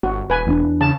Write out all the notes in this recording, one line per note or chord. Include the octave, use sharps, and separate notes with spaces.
G1 F#4
E1 B4 G#5
E2 B3 D4
C#3 A5